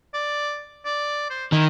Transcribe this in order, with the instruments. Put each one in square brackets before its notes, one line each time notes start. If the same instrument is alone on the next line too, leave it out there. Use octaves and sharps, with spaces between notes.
[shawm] D5
D5
C5
[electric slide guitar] D#3 [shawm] E4